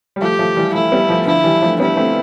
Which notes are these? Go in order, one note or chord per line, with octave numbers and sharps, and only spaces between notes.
G3
F3 A3 G4
F3 A3
E3 G3
F3 A3 E4
G3 B3
F3 A3
D3 F3 E4
E3 G3
F3 A3
G3 B3 E4
A3 C4